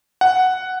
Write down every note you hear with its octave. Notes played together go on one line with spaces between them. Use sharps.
F#5